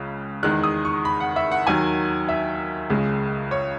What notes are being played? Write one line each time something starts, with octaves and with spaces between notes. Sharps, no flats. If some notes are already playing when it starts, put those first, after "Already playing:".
Already playing: C#2 C#3
E2 D#3 G#3 F#6
D#6
C#6
B5
F#5
E5
F#5
D#2 D#3 F#3 G#5
E5
C#2 C#3 G#3
C#5